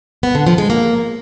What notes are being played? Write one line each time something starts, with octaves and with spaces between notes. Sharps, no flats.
B3
D3
F3
G#3
A#3